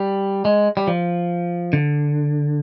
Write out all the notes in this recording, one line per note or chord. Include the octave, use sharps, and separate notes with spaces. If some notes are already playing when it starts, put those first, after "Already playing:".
Already playing: G3
G#3
G3
F3
D3